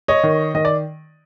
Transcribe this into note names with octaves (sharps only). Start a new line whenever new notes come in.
C#5 D#5
D#3
D#3 D#5
D5